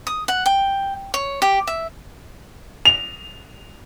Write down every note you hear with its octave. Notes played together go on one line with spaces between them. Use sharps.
D#6
F#5
G5
C#5
G4
E5
F7